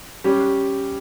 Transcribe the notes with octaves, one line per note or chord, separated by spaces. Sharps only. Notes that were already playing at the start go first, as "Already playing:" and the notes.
G3 C#4 G4